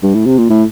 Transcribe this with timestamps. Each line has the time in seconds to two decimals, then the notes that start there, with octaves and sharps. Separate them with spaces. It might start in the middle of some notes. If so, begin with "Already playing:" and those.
0.03 G2
0.14 A2
0.26 C3
0.38 A#2
0.50 A2